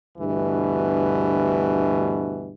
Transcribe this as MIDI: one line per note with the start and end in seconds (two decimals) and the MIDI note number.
0.17 2.52 38
0.17 2.52 43
0.17 2.52 47
0.17 2.52 52